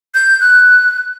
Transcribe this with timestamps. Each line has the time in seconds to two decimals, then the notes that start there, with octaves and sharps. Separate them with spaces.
0.14 G6
0.41 F#6